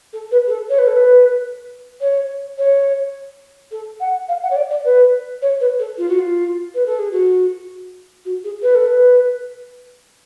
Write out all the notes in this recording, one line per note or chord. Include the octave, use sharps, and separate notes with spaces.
A4
B4
G#4
A4
C#5
B4
A4
B4
C#5
C#5
A4
F#5
F5
F#5
C#5
D5
D5
B4
C#5
B4
A4
F4
F#4
F4
B4
A4
G#4
F#4
F#4
G#4
B4
A4
B4